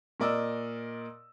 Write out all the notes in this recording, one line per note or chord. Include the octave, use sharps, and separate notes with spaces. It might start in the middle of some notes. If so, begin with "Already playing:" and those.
A#2 A#4 D5 D#5 E6